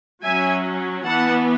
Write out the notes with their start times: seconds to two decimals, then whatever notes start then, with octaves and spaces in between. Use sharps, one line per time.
0.23 F#3 C#4 E5 G#5
1.05 E3 B3 F#5 A5